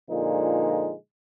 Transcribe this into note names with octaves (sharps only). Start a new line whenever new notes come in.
A#2 D3 F3 G#3 D#4